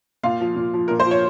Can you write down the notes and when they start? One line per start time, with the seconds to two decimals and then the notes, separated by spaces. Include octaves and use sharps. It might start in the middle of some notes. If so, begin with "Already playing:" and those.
0.23 A#2 F4 F5
0.41 F3
0.56 A#2
0.74 F3
0.88 A#2 A#4
1.00 C5
1.06 F3
1.11 C#5